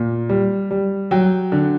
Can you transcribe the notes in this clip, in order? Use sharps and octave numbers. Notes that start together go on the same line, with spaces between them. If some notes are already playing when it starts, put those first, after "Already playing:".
Already playing: A#2
G3
G3
F#3 G5
D3